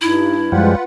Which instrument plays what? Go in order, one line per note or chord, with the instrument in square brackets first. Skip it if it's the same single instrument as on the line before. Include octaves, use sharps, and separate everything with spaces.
[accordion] G2 [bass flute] D#4 [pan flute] E4
[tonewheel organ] F#2 F3 G3 [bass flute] G#3 [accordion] F4 B4 F#5